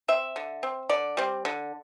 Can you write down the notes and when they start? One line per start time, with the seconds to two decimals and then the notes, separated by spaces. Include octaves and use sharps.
0.08 C4 E5
0.36 D3
0.63 C4
0.89 D3 D5
1.17 G3 C4
1.45 D3